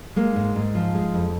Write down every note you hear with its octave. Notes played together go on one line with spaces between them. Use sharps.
G#3 A#3
G#2
G#2
F3
G#3
F2